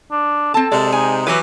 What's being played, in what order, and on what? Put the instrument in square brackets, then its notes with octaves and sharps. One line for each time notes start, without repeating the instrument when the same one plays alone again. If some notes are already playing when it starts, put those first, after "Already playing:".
[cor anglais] D4
[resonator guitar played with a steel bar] C4 A5 [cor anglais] A4
[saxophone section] C3 G#3 [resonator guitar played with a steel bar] D5
[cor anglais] D#4 [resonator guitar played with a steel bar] G#5
[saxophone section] E3 F#3 [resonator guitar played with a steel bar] F#4 G4 B4